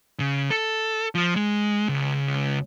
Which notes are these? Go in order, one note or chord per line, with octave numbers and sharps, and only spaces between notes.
C#3
A4
F3
G#3
C#2